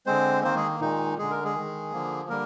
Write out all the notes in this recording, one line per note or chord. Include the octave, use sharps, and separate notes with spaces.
D3 G#3 C4 C5
D#3 A#3 C4 C5
G#3 G#4
A#2 D#3 G#3 D#4
D3 G#3 G#4
A#4
G#3 G#4
D#3 G#3
D3 F3 A#3
D3 G3 A#3 A#4